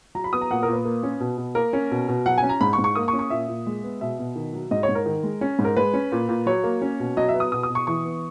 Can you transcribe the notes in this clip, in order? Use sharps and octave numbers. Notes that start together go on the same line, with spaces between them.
F#3 A#5
B5
B3 D#6
A#5
A#2 F#5
A#4
A#2
B4
A#3
C#4
B2
B2
A#3 A#4
C#4
B2
B2
F#3 F#5
G#5
C#4
A#5
G#2 B5
C#6
G#2
C#6
A#3 D#6
C#6
C#4
C#6
A#2 E5
A#2
G#3
B3
B2 E5
B2
D#3
F#3
G#2 D#5
C#5
G#2
A#4
D#3
G#3
C#4
G#2
A#4
G#3 B4
C#4
A#2
A#2
F#3 C#5
A#3
C#4
B2
F#3 D#5
E5
B3
D#6
B2 D#6
D#6
B2
C#6
E3 C#6
B3